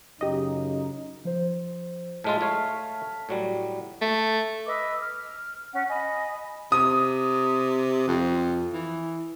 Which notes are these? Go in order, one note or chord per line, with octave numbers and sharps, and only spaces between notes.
F#2 C#3 D#4 G4 D#5
F3 C5
A2 G#3 F4 A5 F6 B6
A3 C#5 F5
A2 F#3 G3
A3
B4 D#5 D6 E6
F6
C#4 F#5
D#5 G#5 B5
C3 D#6
F2
E3